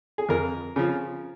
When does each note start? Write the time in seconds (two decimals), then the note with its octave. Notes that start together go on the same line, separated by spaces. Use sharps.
0.18 G#4
0.29 F2 A#4
0.76 C#3 F3